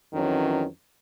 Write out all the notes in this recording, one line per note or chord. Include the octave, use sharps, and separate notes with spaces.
F2 D#3 E3 F#3 C#4